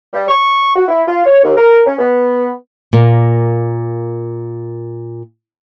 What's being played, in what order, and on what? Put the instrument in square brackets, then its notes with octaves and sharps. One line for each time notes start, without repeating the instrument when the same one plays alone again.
[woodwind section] G3
C#6
F#4
E4
F4
C#5
D#2
A#4
C#4
B3
[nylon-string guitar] A#2 A#3